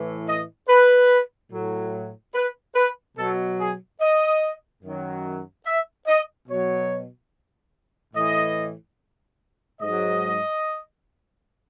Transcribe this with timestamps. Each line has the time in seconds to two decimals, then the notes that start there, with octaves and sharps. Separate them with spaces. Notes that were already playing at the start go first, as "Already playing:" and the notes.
Already playing: A2 E3
0.27 D#5
0.69 B4
1.52 A2 F#3
2.34 B4
2.75 B4
3.17 B2 F#3 A4
3.59 G#4
4.01 D#5
4.83 F#2 D#3 F#3
5.66 E5
6.07 D#5
6.48 B2 F#3 C#5
8.14 A2 E3 D#5
9.80 G#2 F#3 D#5